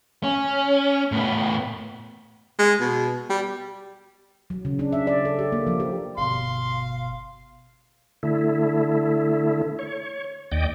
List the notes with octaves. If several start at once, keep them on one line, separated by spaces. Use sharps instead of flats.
C#4
A2 B3
G#3
B2
G3
F#3
C#3
D4
E5
D5
A4
G4
A#3
F3
G4
G1 B2 F5 C6
D3 A3 E4
C#5
D#2 D5 D#5 G5